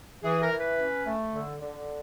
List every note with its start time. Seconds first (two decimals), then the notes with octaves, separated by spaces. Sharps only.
0.23 E3 G#4
0.41 A#4
0.51 E3
0.59 B4
0.78 C#4
1.06 A3
1.34 D3
1.61 D3